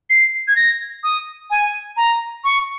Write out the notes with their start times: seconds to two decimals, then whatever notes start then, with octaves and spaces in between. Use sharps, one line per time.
0.10 C7
0.48 G#6
0.56 A#6
1.03 D#6
1.50 G#5
1.97 A#5
2.44 C#6